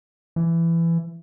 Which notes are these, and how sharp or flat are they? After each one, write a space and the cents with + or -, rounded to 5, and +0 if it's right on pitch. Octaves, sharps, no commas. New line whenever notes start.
E3 +20